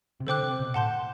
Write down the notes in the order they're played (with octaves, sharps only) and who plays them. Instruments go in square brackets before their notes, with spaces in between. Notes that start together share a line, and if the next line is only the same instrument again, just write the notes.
[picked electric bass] C3
[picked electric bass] D3 [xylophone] A4 C5 G5 D6 F#6
[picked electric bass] C3
B2
[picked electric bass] A2 [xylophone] F#5 A5 C6 G6